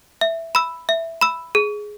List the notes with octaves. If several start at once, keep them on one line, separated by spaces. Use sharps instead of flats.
E5
B5 E6
E5
B5 E6
G#4